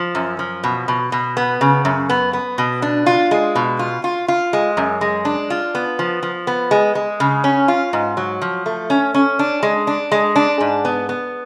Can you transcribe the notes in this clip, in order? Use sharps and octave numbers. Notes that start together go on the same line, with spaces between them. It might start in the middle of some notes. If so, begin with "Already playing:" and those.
Already playing: F3
F#2
F3
B2
B2
B2
B3
C#3
F#2
B3
B3
B2
D4
F4
G#3
B2
F4
F4
F4
G#3
F#2
G#3
D4
F4
B3
F3
F3
B3
G#3
G#3
C#3
C#4
F4
G#2
F#3
F3
A3
C#4
C#4
D4
G#3
D4
G#3
D4
G#2
B3
B3